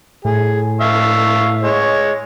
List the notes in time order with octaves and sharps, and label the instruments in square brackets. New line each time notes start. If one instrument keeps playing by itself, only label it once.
[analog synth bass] A2 [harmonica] G#4
[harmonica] E5 F5 C#6
G#3 C#5